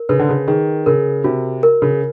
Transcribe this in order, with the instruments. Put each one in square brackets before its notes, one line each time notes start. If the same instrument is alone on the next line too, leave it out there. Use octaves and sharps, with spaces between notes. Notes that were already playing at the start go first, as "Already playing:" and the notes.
Already playing: [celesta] A#4
[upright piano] C#3 [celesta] B4
[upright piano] D3
C#3
[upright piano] D#3 [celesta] G#4
[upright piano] C#3 [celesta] A#4
[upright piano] C3 [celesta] F#4
[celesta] A#4
[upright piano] C#3